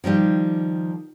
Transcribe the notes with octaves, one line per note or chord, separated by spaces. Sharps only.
D#3 F3 G3 G4